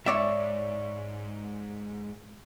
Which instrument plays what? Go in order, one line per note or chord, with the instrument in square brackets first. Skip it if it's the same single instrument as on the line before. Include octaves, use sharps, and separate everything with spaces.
[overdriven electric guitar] G#2 [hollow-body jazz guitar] C#5 D5 E5